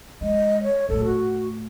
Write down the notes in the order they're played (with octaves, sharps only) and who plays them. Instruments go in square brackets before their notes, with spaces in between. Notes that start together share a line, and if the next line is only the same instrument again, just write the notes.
[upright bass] G#3 [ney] D#5
[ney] C#5
[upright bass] A2 A3 [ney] A4
[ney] F#4